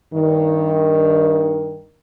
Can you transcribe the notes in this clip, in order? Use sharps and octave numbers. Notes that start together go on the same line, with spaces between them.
G2 D#3